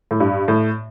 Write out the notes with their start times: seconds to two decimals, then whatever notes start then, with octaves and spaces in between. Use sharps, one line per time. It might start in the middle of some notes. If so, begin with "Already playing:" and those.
0.11 A2
0.20 G2
0.48 A2